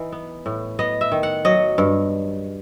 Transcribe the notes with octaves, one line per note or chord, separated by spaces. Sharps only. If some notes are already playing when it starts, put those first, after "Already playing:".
Already playing: E3 D#4
B3
A2
B3 D#5
E5
D#3
F#5
F#3 D#5
G2